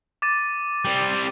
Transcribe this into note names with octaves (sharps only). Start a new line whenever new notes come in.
D6 A6 D#7
G3 C4